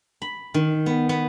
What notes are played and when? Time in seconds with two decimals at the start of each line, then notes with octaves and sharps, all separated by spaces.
0.22 B5
0.54 D#3
0.86 B3
1.09 B3